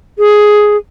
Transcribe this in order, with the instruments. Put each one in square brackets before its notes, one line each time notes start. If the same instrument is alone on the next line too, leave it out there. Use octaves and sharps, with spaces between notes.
[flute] G#4